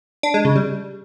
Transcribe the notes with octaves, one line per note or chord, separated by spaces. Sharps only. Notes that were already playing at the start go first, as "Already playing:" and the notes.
D4
G#3
C#3
G3